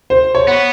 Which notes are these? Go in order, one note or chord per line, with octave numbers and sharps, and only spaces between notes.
C5
C#5
B3